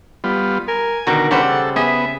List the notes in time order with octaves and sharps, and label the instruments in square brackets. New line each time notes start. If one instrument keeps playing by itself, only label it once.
[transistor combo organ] G3 B3 F4
[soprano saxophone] A#4 [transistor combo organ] G#5
[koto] B2 D#3 [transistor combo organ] D3 A#4 [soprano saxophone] F#4
[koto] C#3 G3 C5 [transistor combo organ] C#4 D4 B4 [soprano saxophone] F#5
[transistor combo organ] A4
[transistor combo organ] B3 [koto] G#4 [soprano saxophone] E5